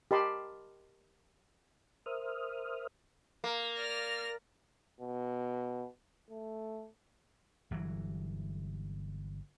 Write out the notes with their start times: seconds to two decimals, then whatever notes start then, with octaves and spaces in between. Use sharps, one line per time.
0.11 G4 A#4 D#5 A5 B5 C6
2.06 A#4 C5 E5 D#6 F6
3.44 A#3
3.75 D5 F6 A#6
5.00 B2
6.30 A3
7.71 G1 E3 F#3